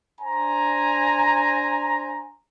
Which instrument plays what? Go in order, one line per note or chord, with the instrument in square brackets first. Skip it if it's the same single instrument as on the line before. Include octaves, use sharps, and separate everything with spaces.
[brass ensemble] D4 C5 G#5 A#5